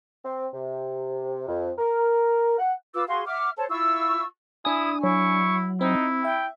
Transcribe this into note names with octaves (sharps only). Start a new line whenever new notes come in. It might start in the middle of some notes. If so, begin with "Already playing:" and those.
C4
C3
F2
A#4
F#5
F4 B4 D6 E6
F#4 G#4 F5 C6
E5 F#5 D6 F6
A4 C5 C#5 A5
E4 F4 C#6 E6
D4 E4 G#5 D#6
F#3 E4 C#6
C4 D#4 E4
E5 G5